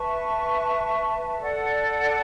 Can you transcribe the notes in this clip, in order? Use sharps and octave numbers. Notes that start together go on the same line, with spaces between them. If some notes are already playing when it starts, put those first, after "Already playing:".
Already playing: B4 E5 A5 C#6
A4 D5 F#5